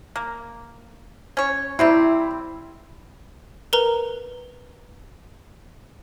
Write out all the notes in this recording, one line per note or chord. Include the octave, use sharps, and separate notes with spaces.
A#3
C#4 C#5
C3 G3 C4 E4
A#4 B4 A#5